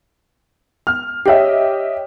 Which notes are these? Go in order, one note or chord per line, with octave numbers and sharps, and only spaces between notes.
F6
G4 C#5 D#5 E5 G5